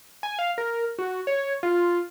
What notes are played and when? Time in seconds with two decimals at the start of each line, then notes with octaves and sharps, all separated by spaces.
0.23 G#5
0.39 F5
0.58 A#4
0.98 F#4
1.27 C#5
1.63 F4